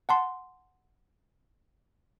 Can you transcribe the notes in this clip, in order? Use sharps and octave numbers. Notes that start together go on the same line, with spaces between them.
F#5 A5 C6